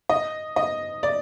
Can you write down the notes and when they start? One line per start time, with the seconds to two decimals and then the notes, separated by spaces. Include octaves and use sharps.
0.09 D#5
0.56 D#5
1.03 D5